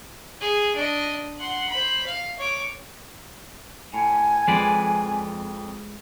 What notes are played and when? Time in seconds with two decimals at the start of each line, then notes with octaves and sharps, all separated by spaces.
0.41 G#4
0.76 D4 D#5
1.39 F#5 C6
1.69 C5 B5
2.06 F5
2.38 C#5 D6
3.94 A2 G#5
4.48 F2 G#3 B4 D5